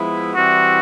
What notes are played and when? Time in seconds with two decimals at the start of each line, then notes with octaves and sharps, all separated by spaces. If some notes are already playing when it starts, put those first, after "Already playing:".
Already playing: F3 G#3 B3 E4
0.35 E3 G3 C4 E4 F#4 G4